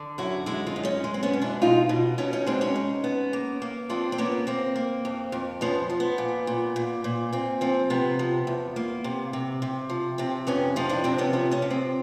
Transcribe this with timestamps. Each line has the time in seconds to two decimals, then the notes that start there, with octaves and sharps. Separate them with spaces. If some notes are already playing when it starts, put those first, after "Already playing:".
Already playing: D3
0.18 F#2 E4 F#4
0.46 G#3 E4 F#4
0.67 D#4 F4
0.76 F#2
0.85 C#4 D#4
1.04 G#3
1.14 C4
1.23 B3 C#4
1.33 B2
1.42 D4 E4
1.62 B2 D#4 F4
1.89 B2
2.18 B2 C#4 D#4
2.33 C#4 D#4
2.47 G#3 C4 D4
2.61 C#4 D#4
2.76 G#3
3.04 B3
3.33 A#3
3.62 A#3
3.90 F3 C4 D4
4.12 C4
4.18 A#3 B3 C#4
4.47 A#3 C4
4.76 A#3
5.05 F2
5.32 F2
5.61 F3 B3 C#4
5.90 F3
6.00 B3
6.18 A#2
6.47 A#2
6.76 A#2
7.04 A#2
7.33 A#2 C4
7.61 F3 C4
7.90 C3 B3
8.19 F3
8.47 E2
8.76 A#3
9.04 C3
9.33 C3
9.62 C3
9.90 F3
10.18 C3 C4
10.47 F2 B3 C#4
10.76 F3 D#4 F4
10.89 D4 E4
11.04 C3 C4 D4
11.18 B3 C#4
11.33 F3 B3 C#4
11.51 B3 C#4
11.62 C3
11.70 C4